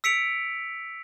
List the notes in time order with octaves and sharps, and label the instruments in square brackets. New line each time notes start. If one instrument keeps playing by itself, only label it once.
[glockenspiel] E6 B6 C#7 D7 F7